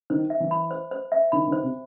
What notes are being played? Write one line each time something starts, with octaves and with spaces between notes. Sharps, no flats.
D#3 C5
E5
E3
B5
C5
C5
E5
D#3 B5
D#3
C5
C3